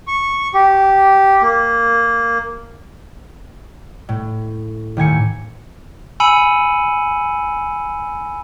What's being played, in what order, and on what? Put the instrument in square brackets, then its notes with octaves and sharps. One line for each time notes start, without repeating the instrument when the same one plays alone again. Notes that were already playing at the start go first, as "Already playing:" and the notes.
[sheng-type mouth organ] C#6
G4
A#3
[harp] A2
D#2 A2 G#5 C#7
[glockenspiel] G#5 B5 E6 C#7 D#7 F#7